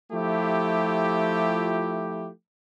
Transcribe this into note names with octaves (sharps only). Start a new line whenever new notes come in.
F3 A3 E4 F4 G4